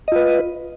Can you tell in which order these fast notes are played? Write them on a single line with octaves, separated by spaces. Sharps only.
D#5 F4 B4